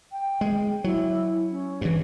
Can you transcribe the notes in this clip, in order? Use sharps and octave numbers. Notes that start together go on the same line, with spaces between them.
G5
G#3
F#3 E4
C#4
G2 E3